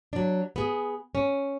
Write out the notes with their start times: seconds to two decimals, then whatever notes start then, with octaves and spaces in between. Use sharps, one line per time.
0.13 F#3 D4
0.56 B3 G#4
1.15 C#4